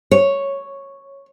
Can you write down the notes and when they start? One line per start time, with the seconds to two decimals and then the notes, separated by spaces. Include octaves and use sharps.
0.11 C#5